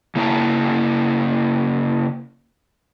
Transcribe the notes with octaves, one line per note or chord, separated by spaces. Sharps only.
C#3 A#3 E4 C#5 A5 A#5